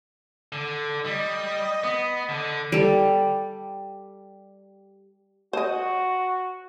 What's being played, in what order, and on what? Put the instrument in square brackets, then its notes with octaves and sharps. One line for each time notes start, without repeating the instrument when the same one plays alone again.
[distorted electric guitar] D3
[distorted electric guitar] G3 [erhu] D#5
[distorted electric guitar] B3
D3
[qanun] G3 A4
[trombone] F#4 [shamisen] C5 D#5